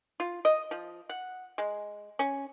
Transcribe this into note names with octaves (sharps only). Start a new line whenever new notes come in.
F4
D#5
F3
F#5
G#3
C#4